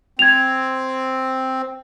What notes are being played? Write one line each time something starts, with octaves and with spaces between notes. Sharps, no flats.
C4 G#6 F7